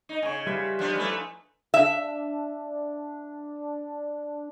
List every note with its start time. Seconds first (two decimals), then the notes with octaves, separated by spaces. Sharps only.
0.09 D#4
0.22 C#3 G#5 C#6
0.47 G3 F4 B4 E5
0.79 F3 B3 D4 F#5
0.95 E3 F3 A3 D#4 E4 B4
1.74 D4 E5